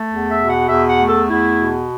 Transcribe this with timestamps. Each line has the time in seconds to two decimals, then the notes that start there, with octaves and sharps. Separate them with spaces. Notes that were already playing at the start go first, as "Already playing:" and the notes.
Already playing: A3
0.09 E2
0.29 E5
0.39 B2
0.48 F#5
0.68 E2 E5
0.89 F#5
0.99 A3
1.08 A4
1.28 E2 E4
1.58 B2